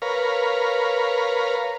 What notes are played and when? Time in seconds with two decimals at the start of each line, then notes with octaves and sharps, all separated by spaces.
0.02 A#4 B4 C#5 F5